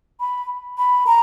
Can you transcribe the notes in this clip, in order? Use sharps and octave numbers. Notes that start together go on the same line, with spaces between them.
B5
B5
A#5